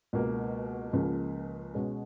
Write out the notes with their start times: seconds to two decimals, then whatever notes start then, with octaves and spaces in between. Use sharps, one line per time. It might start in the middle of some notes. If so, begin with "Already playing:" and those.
0.13 C#2 B2 A#3
0.93 C#2 C#3 F3 A#3
1.74 B2 G#3 C#4